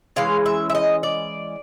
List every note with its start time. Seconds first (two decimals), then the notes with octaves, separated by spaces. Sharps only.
0.16 E3 G#3 C#4 F5
0.46 E5
0.70 E5
0.75 D#5
1.03 D5